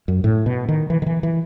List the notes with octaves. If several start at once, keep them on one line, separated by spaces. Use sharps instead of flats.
F#2
A2
B2
D#3
E3
D#3
E3
E3